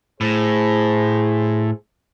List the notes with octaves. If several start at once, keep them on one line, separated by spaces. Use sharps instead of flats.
A2 G#4 C5